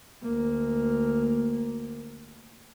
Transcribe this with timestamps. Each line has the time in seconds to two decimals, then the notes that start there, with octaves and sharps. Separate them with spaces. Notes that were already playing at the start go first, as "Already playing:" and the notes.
0.22 D2 A#3